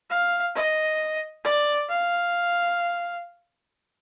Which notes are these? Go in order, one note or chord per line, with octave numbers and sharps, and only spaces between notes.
F5
D#5
D5
F5